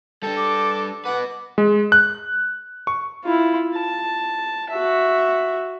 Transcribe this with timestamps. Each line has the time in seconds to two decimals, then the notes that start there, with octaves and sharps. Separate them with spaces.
0.23 G3 D4 A4
0.37 D6
1.05 F#4 B4 F#5 D6
1.58 G#3
1.92 F#6
2.87 C#6
3.24 E4 F4
3.76 A5
4.70 F#4 E5